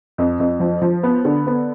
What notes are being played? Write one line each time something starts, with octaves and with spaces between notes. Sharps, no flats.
F2
F2
F3
F3
B3
D3
B3